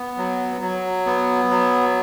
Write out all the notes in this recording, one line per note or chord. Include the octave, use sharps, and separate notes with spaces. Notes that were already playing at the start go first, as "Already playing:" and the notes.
Already playing: B3
F#3
F#3
B3
F#3